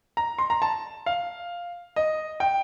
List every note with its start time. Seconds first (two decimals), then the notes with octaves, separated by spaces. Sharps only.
0.17 A#5
0.38 C6
0.50 A#5
0.62 A5
1.06 F5
1.96 D#5
2.40 G5